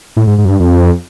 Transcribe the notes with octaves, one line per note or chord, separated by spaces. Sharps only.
A2
G#2
G#2
F#2
G2
F2